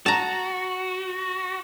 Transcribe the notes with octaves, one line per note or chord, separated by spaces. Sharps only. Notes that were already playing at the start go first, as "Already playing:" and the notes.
F#4 A5 A#5